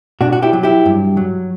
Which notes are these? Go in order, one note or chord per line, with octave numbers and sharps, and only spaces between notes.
B2 D4 F#4
F#4
E4 G4
F#3
E4 G4
G2
F#3